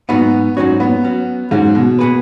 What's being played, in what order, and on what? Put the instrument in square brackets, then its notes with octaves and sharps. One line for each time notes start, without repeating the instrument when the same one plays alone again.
[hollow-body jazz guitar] G#2 F#3 D#4 F#4 [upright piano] B3
[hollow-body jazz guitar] G#2 F#3 D#4 F#4 [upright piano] C#4
[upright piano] B3
[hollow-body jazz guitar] F#3 C#4 F#4
[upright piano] G#2 [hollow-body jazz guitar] F#3 C#4 F#4
[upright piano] B2
[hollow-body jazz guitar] B2 B3 G#4 B4